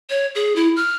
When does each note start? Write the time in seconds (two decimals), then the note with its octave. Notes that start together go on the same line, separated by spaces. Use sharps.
0.10 C#5
0.35 G#4
0.56 E4
0.76 F6